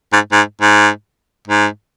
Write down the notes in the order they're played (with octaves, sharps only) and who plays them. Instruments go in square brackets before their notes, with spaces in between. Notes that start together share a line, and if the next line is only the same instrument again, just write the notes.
[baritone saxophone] G#2
G#2
G#2
G#2